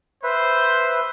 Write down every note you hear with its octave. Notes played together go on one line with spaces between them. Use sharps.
B4 C5 E5